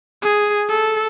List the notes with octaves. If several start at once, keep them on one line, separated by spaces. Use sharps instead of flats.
G#4
A4